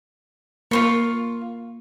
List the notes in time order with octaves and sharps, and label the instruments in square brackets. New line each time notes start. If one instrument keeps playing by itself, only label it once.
[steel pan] A#3 [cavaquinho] F4 C5 C#6